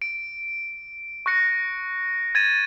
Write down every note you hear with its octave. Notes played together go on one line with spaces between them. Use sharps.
D7
C#6 F#6 A#6 C#7
G#6 A6 D#7